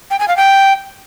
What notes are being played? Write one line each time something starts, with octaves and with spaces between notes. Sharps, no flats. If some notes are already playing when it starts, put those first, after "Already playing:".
G5
G#5
F5
G5